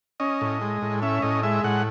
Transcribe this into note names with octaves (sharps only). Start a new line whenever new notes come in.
C#4 D#5
A2
G#3
A2
C#4 E5
A2 D#5
G#3 E5
A2 F#5